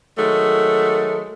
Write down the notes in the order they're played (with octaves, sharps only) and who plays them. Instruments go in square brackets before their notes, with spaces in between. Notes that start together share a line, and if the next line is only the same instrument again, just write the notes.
[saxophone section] D#3 F#3 G#3 A3